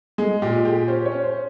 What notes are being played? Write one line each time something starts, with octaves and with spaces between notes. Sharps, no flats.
G#3 G#4
A#2 G4
G4 G#4
C#4 C5
C#5
C#4
C5